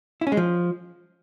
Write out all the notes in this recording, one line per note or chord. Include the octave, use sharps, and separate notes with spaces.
E4
C#4
G#3
F3